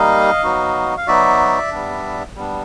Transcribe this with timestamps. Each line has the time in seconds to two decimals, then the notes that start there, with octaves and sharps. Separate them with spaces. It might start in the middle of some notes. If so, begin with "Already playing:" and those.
Already playing: G3 A#3 D#4 D#5 F5
0.43 F#3 B3 D#4 F#4
0.97 F5
1.07 F#3 B3 D#4 F#4 D5 E5
1.72 G3 B3 D4
2.36 G3 B3 D4